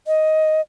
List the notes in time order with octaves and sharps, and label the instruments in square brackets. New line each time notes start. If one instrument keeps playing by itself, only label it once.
[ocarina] D#5